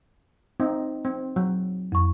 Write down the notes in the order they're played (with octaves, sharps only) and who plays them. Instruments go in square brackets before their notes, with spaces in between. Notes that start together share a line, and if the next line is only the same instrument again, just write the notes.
[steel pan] C4 D#4
C4
F#3
[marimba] F2 C#6